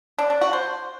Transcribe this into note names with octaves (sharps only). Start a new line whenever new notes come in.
D4
D4
F#4
C5